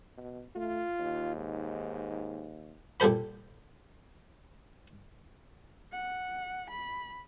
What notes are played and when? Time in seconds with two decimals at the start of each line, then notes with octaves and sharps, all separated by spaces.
0.17 B2
0.56 A3 F4
0.99 D#2
1.37 G#2
3.00 A#2 G3 A4 C5 B5
5.92 F#5
6.70 B5